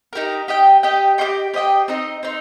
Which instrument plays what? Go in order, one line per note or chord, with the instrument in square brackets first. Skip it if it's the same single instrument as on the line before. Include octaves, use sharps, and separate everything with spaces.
[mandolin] D#4 G4 A#4
G4 D#5 G5
G4 D#5 G5
G4 C5 D#5 G5
G4 C5 D#5 G5
C4 D#4 C5 D#5
C4 D#4 C5